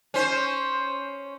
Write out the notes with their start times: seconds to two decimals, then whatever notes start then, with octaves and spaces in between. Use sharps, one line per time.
0.14 C#4 C5